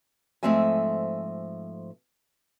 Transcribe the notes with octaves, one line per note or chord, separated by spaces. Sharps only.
G#2 F3 A3 C4 E5 G#5